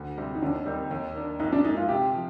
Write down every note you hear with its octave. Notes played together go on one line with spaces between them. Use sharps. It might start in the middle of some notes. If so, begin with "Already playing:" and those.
Already playing: D2
C3 G3 C4
D#4
D#2 D4
D#3 G3 C4 D#4
D#2
D#3 A#3 D4
A#1 D#4
D4
A#2 G#3 D#4
F4
C3 G4
F3